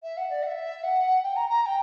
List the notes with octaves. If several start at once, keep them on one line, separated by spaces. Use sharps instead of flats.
E5
F#5
D5
F#5
E5
F#5
G5
A#5
A#5
A#5
G5